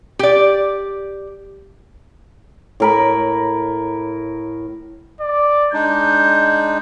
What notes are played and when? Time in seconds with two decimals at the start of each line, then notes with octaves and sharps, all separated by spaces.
0.19 G4 D5
2.80 A2 A#4 B5
5.21 D5
5.73 G#3 D4 D#4 G6